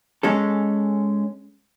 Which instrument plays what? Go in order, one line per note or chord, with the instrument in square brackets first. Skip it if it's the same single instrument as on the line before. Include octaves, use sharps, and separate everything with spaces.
[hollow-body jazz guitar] G#3 C#4 A4